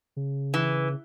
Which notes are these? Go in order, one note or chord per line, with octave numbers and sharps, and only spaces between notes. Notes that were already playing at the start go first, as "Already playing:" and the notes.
C#3
E3